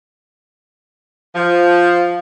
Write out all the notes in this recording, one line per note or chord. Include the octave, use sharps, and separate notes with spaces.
F3